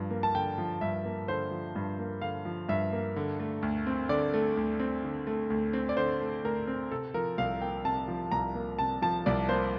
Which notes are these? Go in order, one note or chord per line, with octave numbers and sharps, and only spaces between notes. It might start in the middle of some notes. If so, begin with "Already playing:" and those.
Already playing: G2 F3
A#3
A5
D3 G5
F3
G2 E5
A#3
D3 C5
F3
G2
A#3
D3 F5
F3
G2 E5
A#3
D3
A3
D2
C4
D3 D5
A3
D2
C4
D3
A3
D2
C4
D5
D3 C5
A3
D2 A#4
C4
C3 A4
F3 A#4
C2 F5
A#3 G5
C3 A5
F3
C2 A#5
A#3
C3 A5
F3 A5
C2 D5
A#3 C5